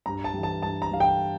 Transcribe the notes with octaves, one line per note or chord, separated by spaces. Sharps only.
G2 A#5
A5
E3 G3
A5
G2 A5
A#5
E3 G3 F5
G5